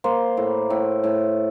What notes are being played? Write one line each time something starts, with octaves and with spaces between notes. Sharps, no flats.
A#3 C5
A2
A2
A2